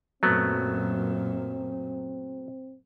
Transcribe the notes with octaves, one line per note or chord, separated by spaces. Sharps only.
F#2 A#2 F#3 A3 B3 C4